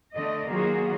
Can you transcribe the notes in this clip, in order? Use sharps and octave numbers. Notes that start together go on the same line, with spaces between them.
D3 A3 D5 D#5
D#3 F#3 A#3 F4 F#4 G#4